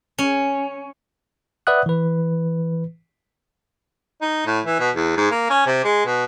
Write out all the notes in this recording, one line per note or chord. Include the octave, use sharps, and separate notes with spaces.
C#4
B4 D5 E5 F#5 D#6 F#6
E3 B4
D#4
A2
E3
B2
E2
G#2
A#3
C#4
C3
G#3
B2